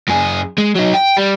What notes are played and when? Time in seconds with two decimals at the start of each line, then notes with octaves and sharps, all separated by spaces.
0.09 F#2 G#4
0.58 G#3
0.76 F#3 D#4
0.95 G5
1.18 G3